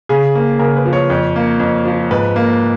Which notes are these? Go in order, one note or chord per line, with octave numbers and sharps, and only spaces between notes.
C#3 G#4
A#3
C#3 A#4
B4
F3
C#5
F2
A#3
F2
F3
G#2 B4
A#3